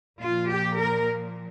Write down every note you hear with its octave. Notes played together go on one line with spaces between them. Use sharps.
A#2 F3 F4
G4
A#4